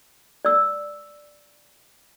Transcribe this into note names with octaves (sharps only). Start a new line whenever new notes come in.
D5 E6